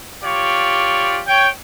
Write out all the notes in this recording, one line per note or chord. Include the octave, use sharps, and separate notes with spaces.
F4 G4 C#5 D5
C#5 G5